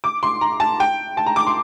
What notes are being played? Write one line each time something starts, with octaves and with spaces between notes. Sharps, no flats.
D6
C6
A#5
A5
G5
A5
A#5
D6
C6